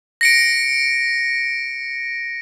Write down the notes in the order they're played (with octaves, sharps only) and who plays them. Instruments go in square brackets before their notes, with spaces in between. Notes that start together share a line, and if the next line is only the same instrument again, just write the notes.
[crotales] A#6 C#7 D7